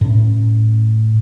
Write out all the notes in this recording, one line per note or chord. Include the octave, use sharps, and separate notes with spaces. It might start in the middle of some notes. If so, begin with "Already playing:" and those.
A2 C#4